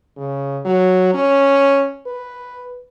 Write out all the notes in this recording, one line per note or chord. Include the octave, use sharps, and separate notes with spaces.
C#3
F#3
C#4
B4